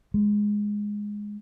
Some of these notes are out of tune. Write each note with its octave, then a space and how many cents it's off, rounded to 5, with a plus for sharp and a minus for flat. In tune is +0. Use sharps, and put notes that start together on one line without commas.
G#3 -5